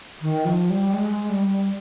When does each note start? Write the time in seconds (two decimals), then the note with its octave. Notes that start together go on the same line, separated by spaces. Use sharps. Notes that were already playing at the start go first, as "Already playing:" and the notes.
0.21 D#3
0.45 F3
0.70 G3
0.94 G#3
1.29 G3